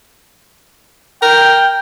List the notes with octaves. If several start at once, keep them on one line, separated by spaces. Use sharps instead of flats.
A#4 G5